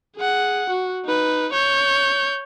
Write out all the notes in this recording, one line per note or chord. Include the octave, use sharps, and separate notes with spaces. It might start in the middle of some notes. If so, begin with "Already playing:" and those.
G#4 F#5
F#4
D#4 B4
C#5 G6